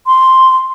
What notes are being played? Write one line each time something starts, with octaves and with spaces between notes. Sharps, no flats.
C6